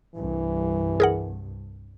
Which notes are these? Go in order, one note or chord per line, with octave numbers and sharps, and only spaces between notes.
C2 G2 E3
G#4 A#4 F#5